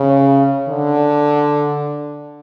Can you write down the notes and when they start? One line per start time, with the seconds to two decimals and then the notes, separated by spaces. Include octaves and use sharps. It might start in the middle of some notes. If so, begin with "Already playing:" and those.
Already playing: C#3
0.69 D3